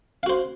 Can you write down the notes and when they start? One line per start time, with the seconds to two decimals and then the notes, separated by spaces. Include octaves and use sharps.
0.23 F5
0.26 F#4
0.29 C5